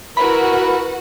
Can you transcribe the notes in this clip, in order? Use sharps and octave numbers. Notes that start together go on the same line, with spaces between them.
E4 F#4 A#4 B4 B5